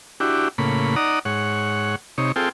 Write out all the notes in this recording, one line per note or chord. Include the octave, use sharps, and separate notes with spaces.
D4 E4 F#4 G4
A2 C#3 A#3 B5
D#4 D5 F#5 A#5 D#6
G#2 C#5 F#5
C3 D#4 C#5
C4 F4 G#4 A4 G5